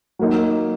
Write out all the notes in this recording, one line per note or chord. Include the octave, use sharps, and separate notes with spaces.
F#3 A#3 D#4